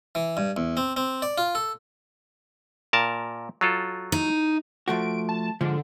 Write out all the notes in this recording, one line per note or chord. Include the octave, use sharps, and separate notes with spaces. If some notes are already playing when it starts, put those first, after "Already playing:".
E3
G2
E2
C4
C4
D5
F4
A4
A#2 A#4 A5
F#3 F4 A4
D#4
F3 A3 F#4 D7
A5
G#2 D3 F3